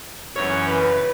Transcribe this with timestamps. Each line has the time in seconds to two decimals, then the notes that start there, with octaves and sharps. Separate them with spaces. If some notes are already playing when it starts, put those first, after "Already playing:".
0.35 F#2 C#3 E3 C#5
0.67 B4